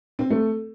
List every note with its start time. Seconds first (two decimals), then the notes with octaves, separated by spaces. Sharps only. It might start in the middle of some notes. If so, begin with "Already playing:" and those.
0.19 C4
0.30 A3